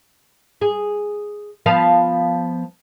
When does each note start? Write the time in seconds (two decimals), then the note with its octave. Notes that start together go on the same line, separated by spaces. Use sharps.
0.61 G#4
1.66 F3 B3 F5